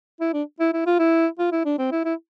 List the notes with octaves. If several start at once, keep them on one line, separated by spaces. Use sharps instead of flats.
E4
D4
E4
E4
F4
E4
F4
E4
D4
C4
E4
E4